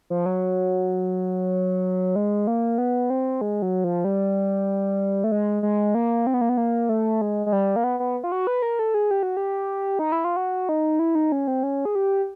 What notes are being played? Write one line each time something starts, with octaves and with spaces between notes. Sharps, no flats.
F3
F#3
G#3
A#3
B3
C4
G#3
F#3
F3
G3
A3
G#3
G#3
A#3
C4
B3
A#3
B3
A#3
A3
G#3
G#3
G3
A#3
B3
B3
F4
F#4
B4
A#4
A4
G#4
G4
F#4
G4
D#4
E4
F4
F#4
D#4
E4
D#4
C#4
C4
C#4
G#4
G4